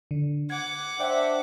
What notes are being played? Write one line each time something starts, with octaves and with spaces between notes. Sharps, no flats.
D3
F#5 D6 G#6
D4 C5 D5 E5 G5